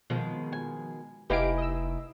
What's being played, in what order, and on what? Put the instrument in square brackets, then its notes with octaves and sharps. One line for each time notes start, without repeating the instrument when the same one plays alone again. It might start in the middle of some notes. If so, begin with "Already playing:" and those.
[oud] B2 D#3 G#3 [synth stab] F3
[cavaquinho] G#5
[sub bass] F1 [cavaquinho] D#4 E4 G#5 [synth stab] G4 F5 D7 [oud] B4
[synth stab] D#5 E6